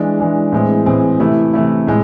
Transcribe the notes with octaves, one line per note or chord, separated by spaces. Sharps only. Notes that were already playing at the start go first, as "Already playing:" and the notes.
Already playing: E3 G#3 D4
E3 G#3 D4
A2 E3 G#3 C4 G#4
A2 E3 G#3 C4 G#4
C3 E3 A3 E4
C3 E3 A3 E4
A2 G#3